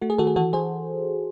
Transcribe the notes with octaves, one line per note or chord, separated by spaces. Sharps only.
A3 F#4
G#4
D#3 F#4 A4
G#4
E3 F#4 A4
E3 G#4 C5